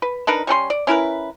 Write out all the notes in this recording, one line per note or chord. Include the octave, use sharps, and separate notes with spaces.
B4
D4 D#4 A#4 B4
G3 C#4 A4 C6
D5
C#4 E4 A#4 B4